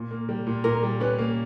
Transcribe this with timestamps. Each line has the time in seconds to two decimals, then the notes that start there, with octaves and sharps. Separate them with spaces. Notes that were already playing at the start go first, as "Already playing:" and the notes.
Already playing: A#2
0.11 A#3
0.29 G3
0.47 A#2
0.64 A#2 A#4
0.83 G3
1.00 C#4 B4
1.19 A#3